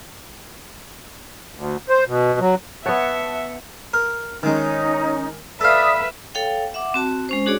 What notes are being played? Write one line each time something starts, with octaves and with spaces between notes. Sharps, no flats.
D2
C5
B2
F#3
B3 C#5 E5 F#5 A5 C#7
A#4
D#3 G#3 C#4 D#4
A4 B4 D5 E5 F5 D#6
A4 C#5 F5 G5
E5 F#5 D6
C4 F#4 A5
G#3 C#4 C5
D4 F#4 G#4 C#5 D5